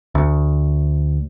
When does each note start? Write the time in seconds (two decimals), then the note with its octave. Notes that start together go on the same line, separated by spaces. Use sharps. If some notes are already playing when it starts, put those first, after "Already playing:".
0.15 D2